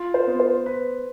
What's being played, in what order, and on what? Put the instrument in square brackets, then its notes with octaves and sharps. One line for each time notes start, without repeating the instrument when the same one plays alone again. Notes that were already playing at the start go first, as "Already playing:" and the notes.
Already playing: [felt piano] F4
[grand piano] C5
[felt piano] B3
[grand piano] C5
[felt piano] B4